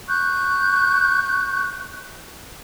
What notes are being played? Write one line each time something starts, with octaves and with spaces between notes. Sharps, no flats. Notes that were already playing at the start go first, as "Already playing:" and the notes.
C#6 F#6 G6